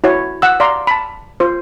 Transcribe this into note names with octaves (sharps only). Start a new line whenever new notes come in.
E4 F#4 C#5
F#5 E6
D5 F5 A#5 C6
A5 B5
F4 C5